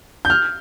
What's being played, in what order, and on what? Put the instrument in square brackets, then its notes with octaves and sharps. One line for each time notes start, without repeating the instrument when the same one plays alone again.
[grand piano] G6
F6